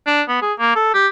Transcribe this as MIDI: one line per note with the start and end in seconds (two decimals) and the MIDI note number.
0.07 0.22 62
0.28 0.41 59
0.42 0.53 68
0.59 0.75 58
0.75 0.94 69
0.94 1.07 67